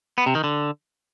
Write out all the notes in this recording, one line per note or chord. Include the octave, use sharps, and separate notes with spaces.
B3
C3
D#3
D3